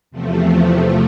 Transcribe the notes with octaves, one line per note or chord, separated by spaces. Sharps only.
E2 C3 F3 A3